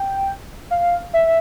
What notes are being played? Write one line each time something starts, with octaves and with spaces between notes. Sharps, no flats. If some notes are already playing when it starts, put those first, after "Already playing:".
Already playing: G5
F5
E5